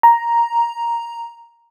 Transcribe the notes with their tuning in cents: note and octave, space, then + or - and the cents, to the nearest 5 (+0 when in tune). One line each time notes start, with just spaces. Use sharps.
A#5 +5